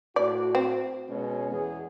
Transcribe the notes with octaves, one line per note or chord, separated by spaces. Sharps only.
A2 F#4 D5
C4
B2 G#3 C#4
E2 B3 G#4